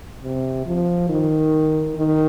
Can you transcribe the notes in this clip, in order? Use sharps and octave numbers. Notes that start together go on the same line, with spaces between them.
C3
F3
D#3
D#3